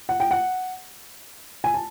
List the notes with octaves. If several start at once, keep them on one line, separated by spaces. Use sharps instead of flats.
F#5
G5
F#5
G#5
A5